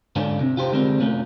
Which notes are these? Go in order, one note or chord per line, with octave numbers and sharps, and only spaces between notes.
G#2 D3 C#4 D4 F4
C3
F4 G4 C5
D3 G3 G#3 C4 A#4
C3 A3 C#4 F4